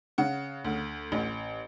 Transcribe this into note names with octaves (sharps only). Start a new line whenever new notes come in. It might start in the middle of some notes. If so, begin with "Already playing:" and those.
C#3 F#5
D2
A1